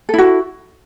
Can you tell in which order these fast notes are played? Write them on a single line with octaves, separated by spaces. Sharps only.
A4 E4 F#4